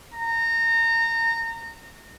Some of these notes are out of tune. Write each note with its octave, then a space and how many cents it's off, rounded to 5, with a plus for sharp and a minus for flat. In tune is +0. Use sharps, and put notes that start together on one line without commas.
A#5 -25